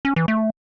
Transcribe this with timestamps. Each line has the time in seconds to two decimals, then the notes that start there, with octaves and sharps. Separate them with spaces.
0.05 C#4
0.16 E3
0.28 A3